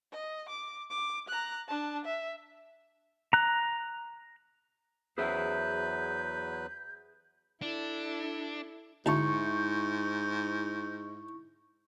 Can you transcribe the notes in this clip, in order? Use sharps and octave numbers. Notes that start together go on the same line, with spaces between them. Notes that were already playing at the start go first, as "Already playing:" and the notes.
D#5
D6
D6
A#5 F#6
D4 A5
E5
A#5 F#6
E2 F#3 G#4 B4 C5 E5 G6
D4 E4 A4
D2 G#2 E4 A5 C#6 G6